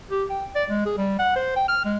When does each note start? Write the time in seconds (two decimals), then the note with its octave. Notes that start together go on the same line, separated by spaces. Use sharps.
0.11 G4
0.30 G5
0.55 D5
0.69 G#3
0.86 G#4
0.98 G3
1.19 F#5
1.36 C5
1.56 G5
1.68 F6
1.85 G#3